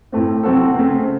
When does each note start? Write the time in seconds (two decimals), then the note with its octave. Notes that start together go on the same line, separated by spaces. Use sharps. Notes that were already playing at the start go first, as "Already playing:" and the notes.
0.12 A2 A3 C4
0.43 C3 F#3 C4 F#4 A4
0.75 C#3 A3 C4